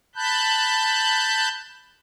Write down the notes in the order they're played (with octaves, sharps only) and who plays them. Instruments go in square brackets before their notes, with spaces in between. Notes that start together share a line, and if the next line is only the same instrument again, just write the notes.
[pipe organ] A5 B5 F#6 G6